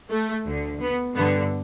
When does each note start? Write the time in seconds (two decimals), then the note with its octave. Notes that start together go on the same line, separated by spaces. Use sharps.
0.10 A3
0.45 D2 D3
0.80 B3
1.15 G2 D3 B3